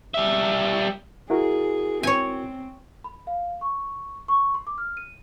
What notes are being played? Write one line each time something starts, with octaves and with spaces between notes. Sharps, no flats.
G3 E5
E4 F#4 G#4 A#4
C4 C#5 G#5
B5
F5
C#6
C#6
C6
D6
F6
D#7